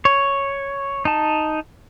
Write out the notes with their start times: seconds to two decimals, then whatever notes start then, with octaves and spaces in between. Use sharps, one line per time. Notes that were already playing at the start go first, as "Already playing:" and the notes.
0.05 C#5
1.05 D#4 A5